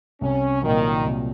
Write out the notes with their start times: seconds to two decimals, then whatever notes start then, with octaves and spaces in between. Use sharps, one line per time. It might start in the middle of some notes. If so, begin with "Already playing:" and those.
0.21 C2 C#4
0.63 A#2 D#3 F#3
1.04 C2